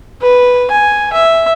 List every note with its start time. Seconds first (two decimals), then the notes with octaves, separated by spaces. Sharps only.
0.21 B4
0.70 G#5
1.13 E5